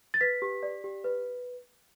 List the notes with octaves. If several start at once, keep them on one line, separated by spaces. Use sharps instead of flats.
A6
B4 B6
G4
D5
G4
B4